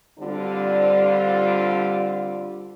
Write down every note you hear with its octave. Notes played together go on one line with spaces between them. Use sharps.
D3 G3 C4 D4 F4